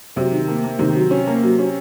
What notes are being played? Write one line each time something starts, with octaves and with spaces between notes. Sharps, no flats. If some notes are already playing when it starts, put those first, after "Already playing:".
C3 F#3
D#3
A#3
A#3
C3 D#3
F#3
C#4
A#3
F#3
C#4